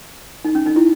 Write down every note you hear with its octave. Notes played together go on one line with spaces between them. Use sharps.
D#4
C#4
D#4
E4